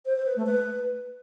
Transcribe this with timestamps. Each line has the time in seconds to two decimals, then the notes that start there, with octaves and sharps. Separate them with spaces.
0.06 C5
0.16 C5
0.26 B4
0.36 A3
0.46 B4